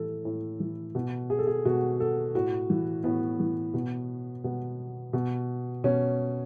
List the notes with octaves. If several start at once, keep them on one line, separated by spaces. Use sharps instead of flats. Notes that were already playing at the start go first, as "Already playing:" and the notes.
Already playing: A2 E3 A4
A2
E3
B2
G#4
A4
G#4
B2 F#4
A4
A2 F#4
E3
A2 B3
E3
B2
B2 B3
B2
B2 C#4